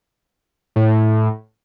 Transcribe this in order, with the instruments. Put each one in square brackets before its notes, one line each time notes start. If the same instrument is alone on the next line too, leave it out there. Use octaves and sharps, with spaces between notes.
[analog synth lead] A2